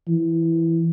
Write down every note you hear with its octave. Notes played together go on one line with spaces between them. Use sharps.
E3